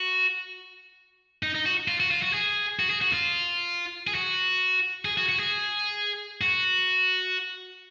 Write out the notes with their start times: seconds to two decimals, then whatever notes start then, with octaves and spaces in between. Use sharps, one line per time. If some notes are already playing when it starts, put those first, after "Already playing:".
Already playing: F#4
1.43 D#4
1.55 D#4
1.66 F#4
1.88 F4
2.00 F#4
2.11 F4
2.22 F#4
2.33 G#4
2.79 F#4
2.90 G#4
3.02 F#4
3.13 F4
4.07 G#4
4.15 F#4
5.05 G#4
5.17 F#4
5.29 F#4
5.40 G#4
6.41 F#4